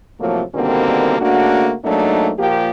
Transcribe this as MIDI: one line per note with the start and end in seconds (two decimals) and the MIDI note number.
0.20 0.42 45
0.20 0.42 48
0.20 0.42 53
0.20 0.42 54
0.20 0.42 57
0.20 0.42 58
0.55 1.18 47
0.55 1.18 50
0.55 1.18 51
0.55 1.18 55
0.55 1.18 58
0.55 1.18 60
1.20 1.73 49
1.20 1.73 57
1.20 1.73 58
1.20 1.73 62
1.20 1.73 66
1.85 2.31 44
1.85 2.31 54
1.85 2.31 57
1.85 2.31 58
1.85 2.31 62
1.85 2.31 63
2.39 2.70 46
2.39 2.70 53
2.39 2.70 58
2.39 2.70 67